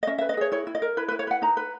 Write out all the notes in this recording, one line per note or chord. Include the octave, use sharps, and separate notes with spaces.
D#5
C#4 E5
E5
B4
D#5
G#4 C#5
E4 C#5
E4
D#5
A#4
E4 B4
B4
E4
C#5
B4 F#5
D#4 A#5
B4